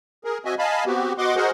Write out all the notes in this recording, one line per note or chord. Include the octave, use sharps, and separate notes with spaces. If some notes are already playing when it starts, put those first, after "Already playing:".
G#4 A#4
C4 F#4 D#5 E5 G#5
D#5 F5 G#5 A5 B5
B3 C4 F#4 G4
B3 F#4 D#5 F#5 C6 D6
F#4 G#4 A#4 C5 D#5 F#5